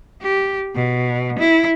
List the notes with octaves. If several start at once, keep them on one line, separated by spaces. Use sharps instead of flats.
G4
B2
E4